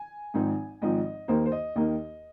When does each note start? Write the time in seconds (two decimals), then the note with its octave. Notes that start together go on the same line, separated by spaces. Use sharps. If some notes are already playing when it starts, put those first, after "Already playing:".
Already playing: G#5
0.34 G#1 G#2 F3 C4 D#4
0.81 G#1 G#2 F3 C4 D#4 D#5
1.28 D#2 D#3 A#3 D#4 C5
1.46 C5
1.52 D#5
1.76 D#2 D#3 A#3 D#4 D#5